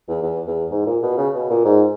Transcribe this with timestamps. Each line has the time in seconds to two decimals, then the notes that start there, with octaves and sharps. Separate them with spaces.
0.08 E2
0.23 E2
0.47 E2
0.71 G#2
0.86 A#2
1.03 B2
1.18 C#3
1.34 B2
1.50 A#2
1.65 G#2